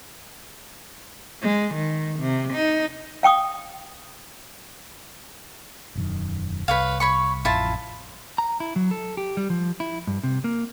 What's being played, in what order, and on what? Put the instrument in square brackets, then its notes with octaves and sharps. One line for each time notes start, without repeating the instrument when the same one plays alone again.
[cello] G#3
D#3
C3
D#4
[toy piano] F5 G5 C#6 D#6
[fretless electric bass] E1 F#2 D#3
[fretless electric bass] C2 [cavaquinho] B4 C#5 F5
[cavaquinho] C#5 B5 C#6
[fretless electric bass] A1 F2 [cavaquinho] E4 F4 A5
[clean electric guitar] A#5
E4
F#3
A4
G4
G3
F3
E4
G2
C3
A#3